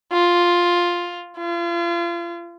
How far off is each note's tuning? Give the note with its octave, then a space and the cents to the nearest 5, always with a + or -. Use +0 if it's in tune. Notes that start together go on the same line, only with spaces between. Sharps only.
F4 +5
F4 -35